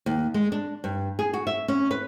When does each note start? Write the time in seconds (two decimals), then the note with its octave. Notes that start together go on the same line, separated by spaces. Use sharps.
0.06 D#2
0.34 G#3
0.52 D4
0.84 G2
1.19 G#4
1.33 F#4
1.47 E5
1.68 C#4
1.91 B4